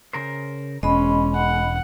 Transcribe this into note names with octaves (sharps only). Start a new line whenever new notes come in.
C#3 A#4 C5
E1 G#3 C#4 D#5 B5
F#5